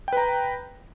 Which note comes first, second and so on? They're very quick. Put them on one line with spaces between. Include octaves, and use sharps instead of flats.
G5 B4 A#5